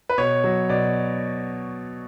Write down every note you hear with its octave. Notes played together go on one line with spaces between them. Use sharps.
B4
B2 C#5
F#3
B2 D5